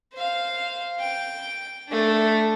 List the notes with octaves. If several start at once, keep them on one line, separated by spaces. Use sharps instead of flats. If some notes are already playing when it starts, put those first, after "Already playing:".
C5 F5
G5
A3 D4